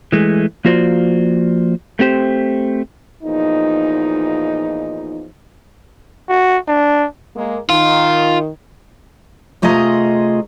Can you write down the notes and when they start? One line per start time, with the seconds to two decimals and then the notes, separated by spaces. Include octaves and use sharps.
0.12 E3 G#3 A3
0.65 F3 A#3 F4 F#4 C5 D5
1.99 A3 C4 G4 C5
3.23 E2 A#2 F3 D#4
6.29 F#4
6.68 D4
7.36 G#3 A#3
7.70 D#3 F4
9.62 C3 A3 F4 G#4 D#5 A#5